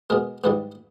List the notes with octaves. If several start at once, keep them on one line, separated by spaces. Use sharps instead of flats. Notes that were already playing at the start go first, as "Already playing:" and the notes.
B2 G#3 A#4
G#2 E3 G3 B4